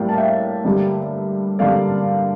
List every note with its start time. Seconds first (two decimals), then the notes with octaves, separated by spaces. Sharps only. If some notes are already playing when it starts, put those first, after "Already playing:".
Already playing: A2 G3 A#3 D5 F5 G5
0.09 A5
0.17 E5 G5
0.65 G2 D3 G3 A#3
1.59 G2 D3 G3 A#3 D5 F5